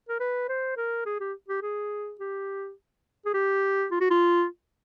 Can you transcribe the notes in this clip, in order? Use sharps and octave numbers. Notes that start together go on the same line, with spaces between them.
A#4
B4
C5
A#4
G#4
G4
G4
G#4
G4
G#4
G4
F4
F#4
F4